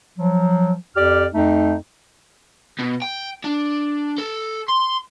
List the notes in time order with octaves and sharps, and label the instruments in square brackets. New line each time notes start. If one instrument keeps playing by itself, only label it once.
[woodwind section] F3 F#3
F2 G4 D5 F6
F2 A3 D#4
[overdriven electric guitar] B2
G5
D4
A4
C6